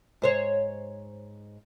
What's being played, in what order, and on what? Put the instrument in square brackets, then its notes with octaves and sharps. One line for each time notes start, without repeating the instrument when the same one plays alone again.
[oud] G#2 C5 C#5